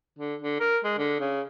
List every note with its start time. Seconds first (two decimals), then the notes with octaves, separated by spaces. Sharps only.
0.19 D3
0.42 D3
0.60 A#4
0.84 G#3
0.98 D3
1.20 C#3